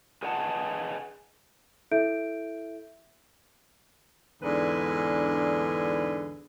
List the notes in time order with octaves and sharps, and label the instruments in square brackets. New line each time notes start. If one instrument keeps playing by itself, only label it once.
[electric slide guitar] G#4 B4 D#5 F#5 G#5 A5
[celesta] E4 A4 E5 G6 D7
[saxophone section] E2 G#2 D3 D4 B4